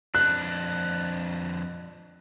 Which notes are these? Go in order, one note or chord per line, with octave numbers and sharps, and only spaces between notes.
F2 D4 F#6